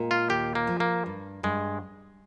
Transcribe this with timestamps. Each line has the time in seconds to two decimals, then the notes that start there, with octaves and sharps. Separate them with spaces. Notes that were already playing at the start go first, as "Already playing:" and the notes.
Already playing: A#2 G#3
0.11 F4
0.29 D#2 G4
0.55 A#3
0.67 F3
0.80 A#3
1.06 G2
1.43 G2 G#3